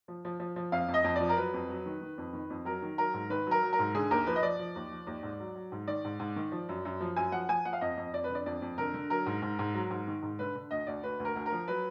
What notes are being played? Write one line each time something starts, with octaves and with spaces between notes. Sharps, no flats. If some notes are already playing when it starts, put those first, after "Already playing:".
F3
F3
F3
F3
F2 F5
F2
D#5
F2
F3 D5
A#4
F#3 B4
F2
F#3
D#3
D#3
F2
D#3
F2
F#3 A#4
D#3
F#3 A#4
G#2
D#3 B4
F#3 A#4
F#3
A#4
G#2
D3 G#4
D#2 A#4
F3 B4
D#5
F3 D5
F3
D#2
F3
D#2
G#2
F#3
F#3
G#2
D#3 D5
G#2
G#2
D#3
F3
F#2
F#2
F3
F#2 G#5
F3 F#5
F3 G#5
F3 F#5
F5
F2 D#5
F2
F2 D5
B4
D3
D5
F2 D5
F2
D3 A#4
D3
F#3 A#4
G#2
G#2
G#2
F#3
G#2
D#3
G#2
D3 B4
D3
D2 D#5
D2 D5
D2 B4
D2
A#4
D2
A#4
F3
F#3 B4